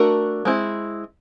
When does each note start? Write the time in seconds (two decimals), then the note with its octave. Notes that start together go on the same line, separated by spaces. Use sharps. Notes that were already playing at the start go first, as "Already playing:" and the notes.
Already playing: A3 D4 F#4 A#4
0.45 G#3 C4 E4